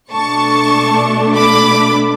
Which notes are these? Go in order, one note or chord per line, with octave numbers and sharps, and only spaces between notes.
B2 A3 D4 A5 C#6
B5 D6